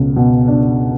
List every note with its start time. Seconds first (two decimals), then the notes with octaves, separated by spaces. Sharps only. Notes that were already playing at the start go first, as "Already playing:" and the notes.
Already playing: C#2 B2
0.16 B2
0.48 D4